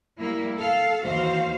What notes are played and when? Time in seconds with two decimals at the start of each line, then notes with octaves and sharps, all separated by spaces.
0.19 G3 A#3 E4
0.57 A4 F5
1.03 D#2 E3 F#4 C5 F5